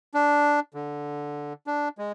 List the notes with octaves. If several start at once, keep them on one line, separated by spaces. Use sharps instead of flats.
D4
D3
D4
G#3